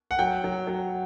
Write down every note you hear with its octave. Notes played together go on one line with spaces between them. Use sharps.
F#5
F#3 G5
F#3
F#3